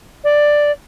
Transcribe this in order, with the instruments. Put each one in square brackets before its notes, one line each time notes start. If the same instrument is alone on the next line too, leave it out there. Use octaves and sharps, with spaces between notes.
[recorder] D5